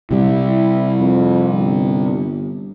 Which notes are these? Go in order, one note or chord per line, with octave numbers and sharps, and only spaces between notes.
C3 G3 E4
F2
G1